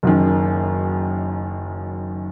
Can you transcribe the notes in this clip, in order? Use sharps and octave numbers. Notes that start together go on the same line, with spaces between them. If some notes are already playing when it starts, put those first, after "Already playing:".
F#1 F#2 D#3